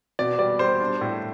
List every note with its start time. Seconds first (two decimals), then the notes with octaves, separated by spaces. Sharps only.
0.19 B2 D5
0.39 G3 D5
0.59 G3 C5
0.80 D4
1.01 A2